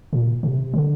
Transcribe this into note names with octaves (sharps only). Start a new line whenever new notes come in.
A#2
C3
D3